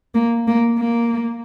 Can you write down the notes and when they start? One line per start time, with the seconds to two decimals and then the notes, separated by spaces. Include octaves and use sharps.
0.14 A#3
0.48 A#3
0.79 A#3